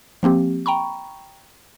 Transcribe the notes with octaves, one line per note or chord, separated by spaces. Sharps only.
F3 A#3 C4 G4
G5 A#5 B5 C#6